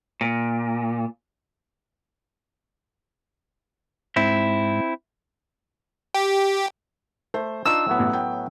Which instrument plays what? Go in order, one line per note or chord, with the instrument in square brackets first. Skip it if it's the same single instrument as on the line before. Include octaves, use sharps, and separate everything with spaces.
[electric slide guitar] A#2
[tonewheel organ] G#2 [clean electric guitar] C4 E4
[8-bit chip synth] G4
[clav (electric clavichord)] A3 [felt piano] C5
[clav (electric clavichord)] D4 D#4 F4 [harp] E6
[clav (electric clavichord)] A2 F#3 B3
[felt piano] A1
G5